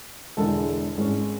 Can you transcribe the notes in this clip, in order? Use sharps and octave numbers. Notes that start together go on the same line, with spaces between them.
E1 E2 D3 G#3 A4
G#1 G#2 G#3 C#4